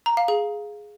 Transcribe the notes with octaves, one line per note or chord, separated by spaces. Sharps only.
A#5
F5
G#4